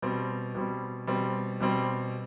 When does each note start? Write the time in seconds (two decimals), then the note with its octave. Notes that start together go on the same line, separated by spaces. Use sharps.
0.02 B2 G3 C4
0.55 B2 G3 C4
1.07 B2 G3 C4
1.60 B2 G3 C4